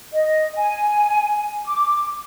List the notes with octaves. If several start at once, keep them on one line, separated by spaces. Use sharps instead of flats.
D#5
G#5
D6